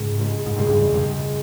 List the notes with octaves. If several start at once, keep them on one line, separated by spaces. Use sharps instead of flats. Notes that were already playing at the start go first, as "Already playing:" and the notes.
Already playing: C#2 G#2 C#3 G#3
C#2 C#3 G#3
G#2
C#2 G2 C#3 G#3
G2
E2
C#2 G2 C#3 G#3